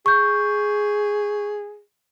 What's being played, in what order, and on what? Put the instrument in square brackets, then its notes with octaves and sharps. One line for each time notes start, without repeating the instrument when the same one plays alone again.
[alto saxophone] G#4 [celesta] C#6 G6